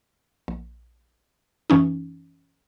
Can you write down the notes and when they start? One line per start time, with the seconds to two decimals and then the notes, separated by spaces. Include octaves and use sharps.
0.48 A#1
1.70 F#2 E3 C#4 D#4